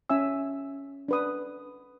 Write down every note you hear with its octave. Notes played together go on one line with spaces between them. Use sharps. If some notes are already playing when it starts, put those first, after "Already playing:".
C#4 E5 G#5 E6
D4 B4 D#6